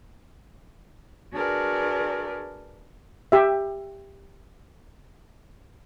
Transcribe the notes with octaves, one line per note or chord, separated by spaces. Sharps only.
D4 F#4 G#4 A#4 B4 D5
G4 E5